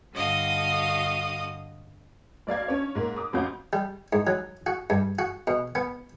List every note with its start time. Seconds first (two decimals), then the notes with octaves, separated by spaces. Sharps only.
0.12 G2 D3 F#4 D#5 F5 D#6
2.47 B1 D5 F5 G#6
2.68 C#4 D4 C#5
2.95 G#2 A#3
3.16 D6 D#6
3.33 A1 F2 C#4 F#4 F5 G6
3.73 G3
4.13 G#2
4.27 F#3
4.66 F#4
4.90 G2
5.19 F#4
5.47 B2
5.75 B3